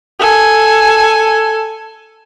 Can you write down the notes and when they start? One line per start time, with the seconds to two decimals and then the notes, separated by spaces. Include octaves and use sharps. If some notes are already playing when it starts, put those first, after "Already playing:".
0.19 A4 G#5